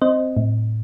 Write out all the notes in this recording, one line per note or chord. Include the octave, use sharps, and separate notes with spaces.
C4 C5 D#5
A2